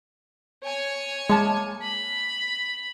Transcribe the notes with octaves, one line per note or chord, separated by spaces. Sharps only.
C#5 G#5
G#3 A#3 A5
B5